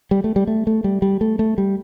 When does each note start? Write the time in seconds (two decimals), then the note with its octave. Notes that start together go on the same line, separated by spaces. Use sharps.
0.11 G3
0.24 A3
0.36 G3
0.47 A3
0.67 A3
0.84 G3
1.02 G3
1.21 A3
1.39 A3
1.58 G3